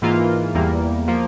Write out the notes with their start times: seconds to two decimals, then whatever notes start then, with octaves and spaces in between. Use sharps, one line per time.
0.02 G#2 E3 A#3 F4
0.55 E2 E3 G3 A#3
1.08 F3 A#3